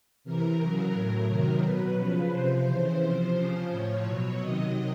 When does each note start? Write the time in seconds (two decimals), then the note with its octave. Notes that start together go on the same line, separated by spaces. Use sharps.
0.24 C3 E3 A#4
0.60 C#3 F#3
0.94 A2 F#3 A#4
1.28 C3 D#3 F#3
1.63 B2 F#3 B4
1.98 C#3 F3
2.32 C3 F3 C5
2.67 C#3 E3
3.01 C3 F3 C5
3.36 C#3 F3
3.70 A2 F3 C#5
4.05 B2 F#3
4.39 C3 D#3 F#3 D#5